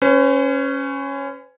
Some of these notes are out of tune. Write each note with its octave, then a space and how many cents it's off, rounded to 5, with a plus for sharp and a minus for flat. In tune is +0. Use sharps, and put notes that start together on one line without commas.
C#4 -5 B4 +45